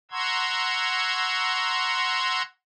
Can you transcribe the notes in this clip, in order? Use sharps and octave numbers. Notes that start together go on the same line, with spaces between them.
F#5 A#5 C6 C#6 E6 G#6